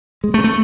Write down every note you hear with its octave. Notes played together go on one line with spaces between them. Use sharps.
G#3
A3
A3